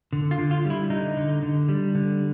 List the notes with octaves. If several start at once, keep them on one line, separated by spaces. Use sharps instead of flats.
D3
F4
D3
F4
G3
E4
D3 D#4
D3
D3
G3
D3